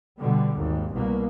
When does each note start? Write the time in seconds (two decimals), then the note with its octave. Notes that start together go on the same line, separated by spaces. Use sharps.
0.20 B2 D3 G3
0.56 G#1 D#2
0.93 C2 B2 A#3